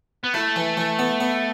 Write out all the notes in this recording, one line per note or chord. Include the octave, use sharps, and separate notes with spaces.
B3
A3 E4
E3
E3
B3
B3